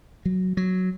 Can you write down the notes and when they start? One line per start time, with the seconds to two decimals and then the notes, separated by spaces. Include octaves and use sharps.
0.25 F#3
0.57 F#3